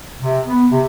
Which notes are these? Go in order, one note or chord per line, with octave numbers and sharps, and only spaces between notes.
C3
B3
C3